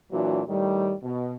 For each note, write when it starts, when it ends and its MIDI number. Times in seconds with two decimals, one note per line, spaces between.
0.11 0.41 46
0.11 0.41 52
0.11 0.41 54
0.11 0.41 62
0.11 0.41 66
0.48 0.93 45
0.48 0.93 51
0.48 0.93 55
1.03 1.35 47